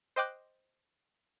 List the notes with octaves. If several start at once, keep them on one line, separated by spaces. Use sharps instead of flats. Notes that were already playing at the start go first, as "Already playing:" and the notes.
C5 D#5 G5 D6 F#6 G6